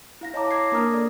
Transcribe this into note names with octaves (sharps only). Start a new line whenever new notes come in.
E4 F5 A#6
C#5 D#5 A5 A#5 D6
A#5 D6 G#6 A#6 C7
A#3 D4 A#4 A#5 D#6 F6
A4 D5